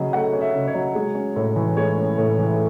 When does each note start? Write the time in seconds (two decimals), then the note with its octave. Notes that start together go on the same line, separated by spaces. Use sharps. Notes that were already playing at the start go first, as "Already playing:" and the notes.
Already playing: C#3 F#3 C#4 D#5
0.13 A3 F#5
0.33 C#4
0.41 E5
0.54 C#3
0.67 C#5
0.74 F#3
0.95 G#3
1.15 C#4
1.36 A2
1.56 E3
1.77 G#3 C#5
1.97 C#4
2.18 A2
2.38 E3